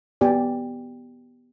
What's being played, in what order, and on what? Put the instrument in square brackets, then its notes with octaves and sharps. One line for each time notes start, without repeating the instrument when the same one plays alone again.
[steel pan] B3 G4 D5 G#5